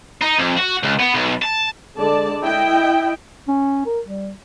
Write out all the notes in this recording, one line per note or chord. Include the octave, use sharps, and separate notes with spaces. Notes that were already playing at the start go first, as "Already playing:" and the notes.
D#4
F2
F#4
C#2
B3
B1
A5
D3 G#3 D5 A5
E4 D#5 G5
C#4
A#4
G3